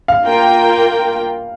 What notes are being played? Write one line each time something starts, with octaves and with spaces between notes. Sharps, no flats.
F5
A#3 F4 A#4 G5